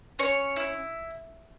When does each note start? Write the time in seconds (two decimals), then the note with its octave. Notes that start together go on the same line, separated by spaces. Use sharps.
0.19 C#4 C#5
0.56 E4